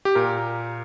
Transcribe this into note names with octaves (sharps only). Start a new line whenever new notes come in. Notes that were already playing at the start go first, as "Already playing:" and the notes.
G4
A#2 A#4